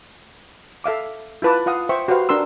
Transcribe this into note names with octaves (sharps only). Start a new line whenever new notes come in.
A4 E5 F5 D6
E4 F4 B4 A5 D6
F4 F5 F#5 D#6
C5 E5 G5 C#6
F#4 G4 B4 C5 F5
D4 A#4 A#5 C6 E6